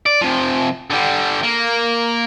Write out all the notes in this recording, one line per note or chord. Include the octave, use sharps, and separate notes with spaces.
D5
C3 F3
D3 G3
A#3